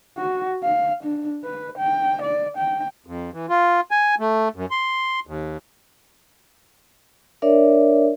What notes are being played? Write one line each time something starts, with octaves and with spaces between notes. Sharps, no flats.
F#4
F5
D4
B4
G5
D5
G5
F2
E3
F4
G#5
A3
F#2
C6
D#2
D4 A#4 C#5 D5 E5